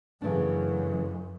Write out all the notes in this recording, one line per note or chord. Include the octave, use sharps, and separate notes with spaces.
F#2 C#3 E3 A3 D4